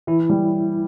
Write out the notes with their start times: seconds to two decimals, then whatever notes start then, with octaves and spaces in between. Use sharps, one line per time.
0.07 E3 E4
0.29 G3